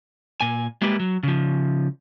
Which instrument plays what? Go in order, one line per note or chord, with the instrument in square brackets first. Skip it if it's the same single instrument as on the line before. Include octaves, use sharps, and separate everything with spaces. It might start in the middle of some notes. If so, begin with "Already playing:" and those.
[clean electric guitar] A#2 G#5
G3 G#3 A#3 E4 G4 B4
F#3
C#3 F3